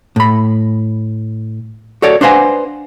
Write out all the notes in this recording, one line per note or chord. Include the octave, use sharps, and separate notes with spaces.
A2 B5
F#4 A4 C#5 D5
D4 B4 C5 F5 F#5 G#5